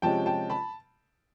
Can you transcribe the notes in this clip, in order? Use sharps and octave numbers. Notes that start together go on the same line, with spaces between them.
C3 F3 G#3 C#4 G5 A5
G5 A5
A5 B5